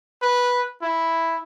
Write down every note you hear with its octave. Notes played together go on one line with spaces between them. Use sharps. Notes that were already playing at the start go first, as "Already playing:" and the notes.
B4
E4